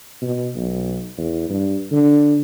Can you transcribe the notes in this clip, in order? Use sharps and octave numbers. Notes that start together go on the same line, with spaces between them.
B2
B1
E2
G2
D3